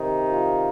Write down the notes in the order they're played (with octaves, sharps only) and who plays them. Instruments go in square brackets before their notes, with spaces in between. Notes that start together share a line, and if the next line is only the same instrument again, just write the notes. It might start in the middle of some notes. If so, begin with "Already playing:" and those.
Already playing: [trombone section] C3 D#3
F4